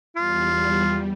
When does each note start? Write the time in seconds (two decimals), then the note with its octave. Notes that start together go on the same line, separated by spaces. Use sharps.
0.16 E2 G3 F4